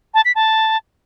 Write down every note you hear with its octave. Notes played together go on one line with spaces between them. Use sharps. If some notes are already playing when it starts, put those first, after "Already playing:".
A5
B6
A5